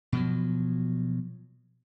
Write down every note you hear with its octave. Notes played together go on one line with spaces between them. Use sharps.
B2 F3 F#3